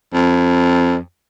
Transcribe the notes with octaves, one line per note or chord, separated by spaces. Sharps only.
F2